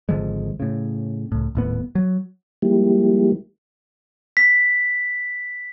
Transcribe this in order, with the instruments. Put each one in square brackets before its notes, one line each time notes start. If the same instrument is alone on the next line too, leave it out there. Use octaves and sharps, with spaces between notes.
[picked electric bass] G#1 D3 F3 G#3
A2 C#3
C#2 A2
D#1 A2 B3
F#3
[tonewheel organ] F3 G3 G#3 A#3 E4 G4
[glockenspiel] B6